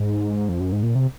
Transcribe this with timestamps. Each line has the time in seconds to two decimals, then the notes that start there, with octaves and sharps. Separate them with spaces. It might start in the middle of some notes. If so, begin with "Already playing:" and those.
Already playing: G#2
0.49 F2
0.60 F#2
0.72 G#2
0.83 A#2
0.95 C3